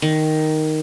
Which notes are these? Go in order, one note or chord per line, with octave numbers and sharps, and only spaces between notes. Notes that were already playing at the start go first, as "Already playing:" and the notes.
D#3